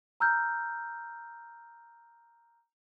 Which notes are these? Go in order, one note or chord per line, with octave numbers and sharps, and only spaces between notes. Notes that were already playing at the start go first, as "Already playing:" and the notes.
A#5 E6 F6 G6